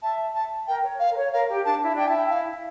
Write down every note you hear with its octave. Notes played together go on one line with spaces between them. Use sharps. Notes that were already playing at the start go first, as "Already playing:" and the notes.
E5 A5
A5
A#4 G5
C#5
F5
A#4
C#5
A#4 F5
G4
D4 A5
E4
D4 G5
E4 A5
G5
F5